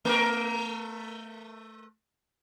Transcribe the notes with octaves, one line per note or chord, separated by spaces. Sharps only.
A3 A#4